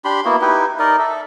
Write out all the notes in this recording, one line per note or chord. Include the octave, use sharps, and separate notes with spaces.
D4 G4 B5 C6
A#3 B3 E4 F#4
D#4 E4 G4 B4
D#4 A#4 D5 D#5
A4 E5